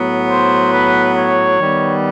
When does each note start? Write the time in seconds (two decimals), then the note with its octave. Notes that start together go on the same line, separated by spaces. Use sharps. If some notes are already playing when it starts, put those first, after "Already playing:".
Already playing: A2 F#3 B3
0.28 C5
0.72 B4
1.16 C#5
1.59 D#3 G3 B3